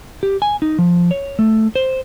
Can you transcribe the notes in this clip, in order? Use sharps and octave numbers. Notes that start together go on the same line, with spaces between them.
G4
G#5
D#4
F3
C#5
A3
C5